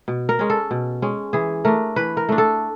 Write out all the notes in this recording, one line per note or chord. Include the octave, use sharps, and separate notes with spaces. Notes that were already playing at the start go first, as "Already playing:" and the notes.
B2
A#4
G#3 C#4
A4
B2
G#3 C#4
E3 G#4
A3 D4 A#4
E3 B4
A#4
A3 D4
A4